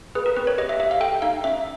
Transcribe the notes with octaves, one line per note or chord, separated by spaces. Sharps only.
G#4 B4
A#4
C4 B4
C#5
G4 D#5
E5
G4 E5
F5
A4 G5
D#4 F5
C#4 E5